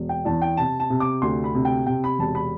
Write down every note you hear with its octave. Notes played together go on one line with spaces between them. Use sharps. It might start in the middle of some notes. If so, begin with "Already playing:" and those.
Already playing: E1
G5
E2 A5
G5
C3 A5
A5
C3
D6
D2 C6
B5
C3
G5
C3 G5
B5
E1 A5
B5